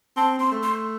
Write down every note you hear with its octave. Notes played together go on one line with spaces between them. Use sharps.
C4 A5
C4 C6
A3
C6